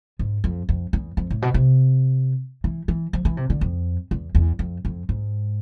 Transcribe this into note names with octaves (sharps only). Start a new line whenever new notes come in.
G#2
F2
F2
E2
F2
A2
B2
C3
E3
E3
F3
E3
C3
D3
F2
E2
E2
F2
F2
G#2